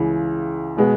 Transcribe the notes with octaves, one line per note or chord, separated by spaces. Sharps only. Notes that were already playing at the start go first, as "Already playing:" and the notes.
Already playing: C#2 C#3 E3
B2 G#3 B3